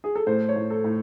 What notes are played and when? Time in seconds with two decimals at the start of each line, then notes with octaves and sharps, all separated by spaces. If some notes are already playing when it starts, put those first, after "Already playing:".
0.04 G#4
0.15 A4
0.27 A2 C5
0.49 C#5
0.56 A2
0.70 A4
0.84 A2